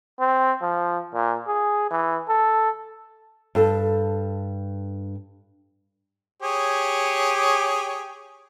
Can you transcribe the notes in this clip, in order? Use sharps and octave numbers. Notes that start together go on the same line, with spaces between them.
C4
F3
A#2
G#4
E3
A4
G2 A4
G4 G#4 C#5